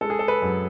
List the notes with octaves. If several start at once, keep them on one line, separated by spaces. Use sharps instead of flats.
G#3 A4
G#4
A4
B4
F#2